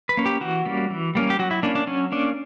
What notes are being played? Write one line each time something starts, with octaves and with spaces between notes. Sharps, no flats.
B4
A#3 C#4
G4
E3 F#4
G3 A#3 C#4
E3
G3 A#3 C#4
G4
F#3 F#4
E4
A#3 C#4 D4
D4
F#3 C#4
A#3 C#4 D4